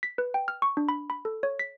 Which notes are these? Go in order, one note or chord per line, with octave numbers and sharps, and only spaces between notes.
B6
B4
G5
F6
C#6
D4
B5
B5
A4
C#5
B6